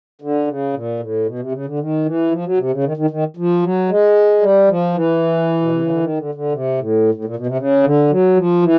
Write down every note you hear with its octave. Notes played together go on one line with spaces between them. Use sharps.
D3
C#3
A#2
A2
B2
C3
C#3
D3
D#3
E3
F3
F#3
C3
C#3
D#3
D#3
D#3
F3
F#3
G#3
G3
F3
E3
B2
C3
C#3
D3
D#3
D3
D3
C3
A2
A2
A#2
B2
C3
C#3
D3
F#3
F3
E3